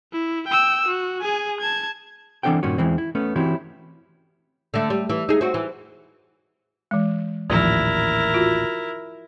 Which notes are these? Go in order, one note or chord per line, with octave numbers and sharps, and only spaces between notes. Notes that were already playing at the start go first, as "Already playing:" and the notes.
E4
G5 E6
F#4
G#4 G#5
A5 G#6
E3 C4 D4 A4 F#5 G5
G2 A#2 D#3 C#4 F#4
E2 E3 G#3 C4
E4
A3 B3 C#4
E3 C4 E4 F#4 G4 C#5
D3 A3
G3
E3
D#4 G#4
C4 F#4
E3
E3 G#3
A1 D#2 A#2 F3 E4 A#4 A#5
F4 F#4